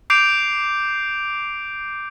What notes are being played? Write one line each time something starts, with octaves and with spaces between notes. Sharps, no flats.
D6 G6 C7 D7 F7